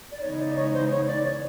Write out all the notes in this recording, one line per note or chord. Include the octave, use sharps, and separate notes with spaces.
D5
C#3 E3 G#3 B3 D#4 C#5
D5
C#5
C5
C#5
D5
C#5